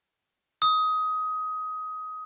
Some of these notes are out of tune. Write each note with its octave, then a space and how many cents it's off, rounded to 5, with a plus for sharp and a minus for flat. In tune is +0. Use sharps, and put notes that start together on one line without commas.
D#6 +20